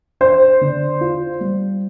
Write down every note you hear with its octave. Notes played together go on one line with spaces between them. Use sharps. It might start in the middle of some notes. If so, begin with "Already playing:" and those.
D4 C5
D3
F4
G3